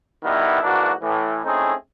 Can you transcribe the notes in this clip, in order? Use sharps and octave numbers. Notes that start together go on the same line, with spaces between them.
B2 D#3 G3 B3 E4
G#2 E3 A#3 D4 F#4
A2 E3
A3 C4 C#4 D#4 E4 G#4